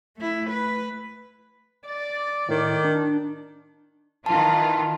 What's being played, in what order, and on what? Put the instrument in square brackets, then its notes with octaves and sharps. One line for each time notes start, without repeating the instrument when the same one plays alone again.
[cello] A3 E4
B4
[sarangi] D5 [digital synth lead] A6
[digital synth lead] A2 [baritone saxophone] D#3
[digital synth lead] D4
[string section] D#3 E3 F4 [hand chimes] A5